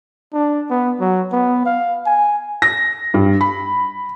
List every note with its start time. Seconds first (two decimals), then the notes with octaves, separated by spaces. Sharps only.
0.33 D4
0.70 B3
1.00 F#3
1.32 B3
1.65 F5
2.06 G#5
2.62 A#6
3.14 G2
3.41 B5